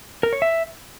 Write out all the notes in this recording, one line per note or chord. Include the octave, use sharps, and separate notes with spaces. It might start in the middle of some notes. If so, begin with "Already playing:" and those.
A#4
C#5
E5